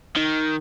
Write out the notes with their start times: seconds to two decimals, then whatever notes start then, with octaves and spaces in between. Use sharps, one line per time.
0.17 D#3